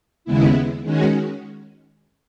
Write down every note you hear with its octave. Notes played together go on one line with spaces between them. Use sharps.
D#2 C#3 G#3 B3 E4
D#3 G#3 C#4 F#4